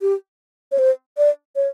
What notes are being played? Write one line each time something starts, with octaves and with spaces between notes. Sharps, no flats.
G4
C#5
C5
D5
C#5